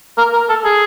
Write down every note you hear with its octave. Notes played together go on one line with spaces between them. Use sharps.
A#4
A#4
A4
G#4